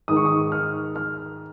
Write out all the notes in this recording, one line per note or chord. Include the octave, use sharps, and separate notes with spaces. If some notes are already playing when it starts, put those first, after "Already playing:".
G#2 D#3 D#6
C#6
D#6
F6
F6